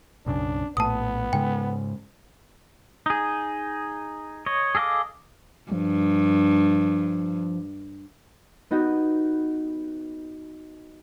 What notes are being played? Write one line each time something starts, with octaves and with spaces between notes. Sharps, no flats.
B1 F#2 C#3 D4
A#1 A2 B3 A5 D#6
G#2 C#3 G#3 G5
D#4 G#4
C#5 D#5
G#4 A4 D#5 F5 D6
G2 F3
B3 D#4 F#4 G4